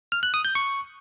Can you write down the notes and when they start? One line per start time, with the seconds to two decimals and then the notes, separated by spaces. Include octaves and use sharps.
0.12 F6
0.23 F#6
0.34 D#6
0.45 G6
0.55 C#6